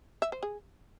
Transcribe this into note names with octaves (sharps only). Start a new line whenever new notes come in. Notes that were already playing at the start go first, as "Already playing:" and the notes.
E5
C5
G#4